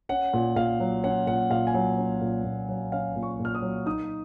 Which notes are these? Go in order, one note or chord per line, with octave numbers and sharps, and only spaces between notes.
C#4 F#5
A#2
A#2 F5
F#3
C#4 F#5
A#2 F#5
A#2 F5
G#5
F#3 F#5
C#4
A#2
A#2
F#3
C#4 F5
A#2
C#6
A#2
F6
D#6
F#3
D#4 D#6